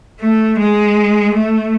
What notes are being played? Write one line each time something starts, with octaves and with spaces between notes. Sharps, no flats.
A3
G#3
A3